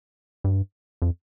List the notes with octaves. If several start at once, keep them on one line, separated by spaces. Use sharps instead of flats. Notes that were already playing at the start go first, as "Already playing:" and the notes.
G2
F2